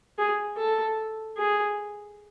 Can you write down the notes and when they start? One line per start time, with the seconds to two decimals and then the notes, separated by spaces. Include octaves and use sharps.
0.18 G#4
0.57 A4
1.38 G#4